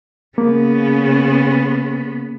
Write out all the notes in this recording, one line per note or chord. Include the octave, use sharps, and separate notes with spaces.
C#3 A#3 B3